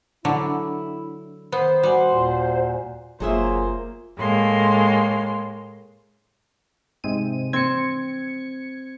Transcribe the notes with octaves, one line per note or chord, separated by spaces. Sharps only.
D3 F#3 D4 E4
D#3 B3 C5
G3 F#4 F#5 G#5
D#2 A#2
F#1 F#3 A#3 F4 G#4 C5 E5
A2 G#3 A#3 C6
G#2 C3 D#7
C4 G#6 C#7